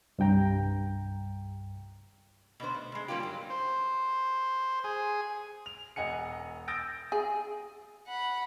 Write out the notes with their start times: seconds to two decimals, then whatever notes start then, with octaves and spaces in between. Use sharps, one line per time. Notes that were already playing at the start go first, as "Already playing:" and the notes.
0.18 C2 G2 G5 A#5
2.60 B2 B3 D4 C5
2.75 A3
2.92 B2 G#3
3.08 G3 A#3 C#4 F4 G4
3.20 G2 F#3
3.50 C5
4.84 G#4
5.66 F7
5.96 E1 D#5 F#5 G#5 C#7
6.68 D#6 E6 G6 A6 A#6 D7
7.12 G#4
8.08 F#5 B5